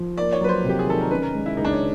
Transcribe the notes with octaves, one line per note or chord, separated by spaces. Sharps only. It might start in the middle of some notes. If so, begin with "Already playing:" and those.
Already playing: F3
A#3 D5
C#5
F#3 B4
C5
C3
G4
G#4
D#3 A4
A#4
C#4 B4
A#4
G#3
E4
C#2 D#4
D4
C#4